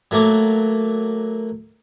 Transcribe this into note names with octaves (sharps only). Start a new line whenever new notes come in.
F#3 A3 A#3